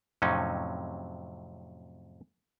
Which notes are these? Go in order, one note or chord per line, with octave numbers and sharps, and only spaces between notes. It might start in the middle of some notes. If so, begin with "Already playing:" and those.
F2 A2 C3 F#3 C#4 D#4